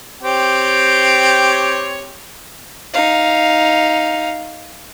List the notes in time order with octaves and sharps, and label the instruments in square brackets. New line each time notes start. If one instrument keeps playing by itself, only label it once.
[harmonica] C4 G4 C#5
[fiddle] D#4 F5